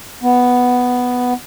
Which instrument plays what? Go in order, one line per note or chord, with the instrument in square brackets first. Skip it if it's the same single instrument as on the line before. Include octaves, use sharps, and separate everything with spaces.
[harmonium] B3